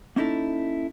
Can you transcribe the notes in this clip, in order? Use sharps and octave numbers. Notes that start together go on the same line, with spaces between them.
A#3 C#4 D#4 E4 A4